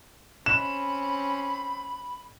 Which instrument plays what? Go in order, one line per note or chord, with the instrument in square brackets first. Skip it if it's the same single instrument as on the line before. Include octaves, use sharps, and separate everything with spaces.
[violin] C4 C#4 [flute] B5 [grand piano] E7